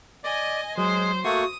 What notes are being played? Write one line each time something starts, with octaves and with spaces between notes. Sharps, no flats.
D5 D#5 G#5
F#3 G#3 C5
A3 A#3 F#4 C#6 D#6